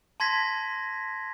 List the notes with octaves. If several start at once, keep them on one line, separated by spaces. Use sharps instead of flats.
A5 C6 G#6 A#6 B6